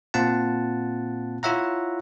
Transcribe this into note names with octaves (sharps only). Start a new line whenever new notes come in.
A#2 C4 F4 F#5 A5
E4 F4 C#5 E5 F#5 A#5